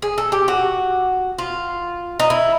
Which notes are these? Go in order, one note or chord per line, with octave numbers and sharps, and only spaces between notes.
G#4
A4
G4
F#4
F4
D#4
E4